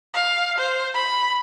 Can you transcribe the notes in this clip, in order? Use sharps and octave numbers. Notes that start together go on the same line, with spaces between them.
F5
C5
B5